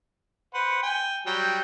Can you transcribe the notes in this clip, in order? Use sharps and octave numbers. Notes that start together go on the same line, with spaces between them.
B4 C5 F#5
G5 G#5
F#3 G3 G5